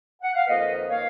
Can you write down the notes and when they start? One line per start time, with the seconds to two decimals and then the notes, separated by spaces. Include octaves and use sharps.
0.22 F#5
0.34 F5
0.47 F2 D#3 A#3 B4 D#5
0.90 D#3 A#3 C#5 F5